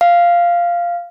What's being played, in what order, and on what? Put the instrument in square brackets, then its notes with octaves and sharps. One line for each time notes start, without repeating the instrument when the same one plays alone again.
[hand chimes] F5